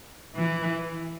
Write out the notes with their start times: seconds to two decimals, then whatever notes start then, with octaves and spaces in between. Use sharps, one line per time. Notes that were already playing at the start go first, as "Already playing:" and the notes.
0.35 E3